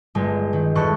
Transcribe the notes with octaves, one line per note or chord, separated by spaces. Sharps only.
G1 G#3
D#3
E1 A4 C#6 F#6